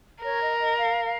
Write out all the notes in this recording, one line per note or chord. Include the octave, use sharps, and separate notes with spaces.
A#4 C#5
D#5
D#5
F5
F5